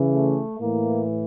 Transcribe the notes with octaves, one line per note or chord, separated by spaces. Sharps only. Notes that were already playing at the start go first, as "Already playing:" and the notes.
Already playing: C#3 E3
A3
A2 E3 A#3